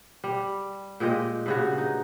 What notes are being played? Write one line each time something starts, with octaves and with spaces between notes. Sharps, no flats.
G3
A#2 G#3 G4 D#5
G2 C#3 F#4
D#4